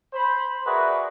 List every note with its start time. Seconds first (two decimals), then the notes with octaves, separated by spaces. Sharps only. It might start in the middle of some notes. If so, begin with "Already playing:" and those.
0.13 C5 B5
0.66 F#4 G#4 A#4 B4 D5 E5